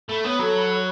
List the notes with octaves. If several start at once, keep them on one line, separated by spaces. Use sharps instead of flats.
A3 B5
B3 C#5
F#3 A4
B5
C#5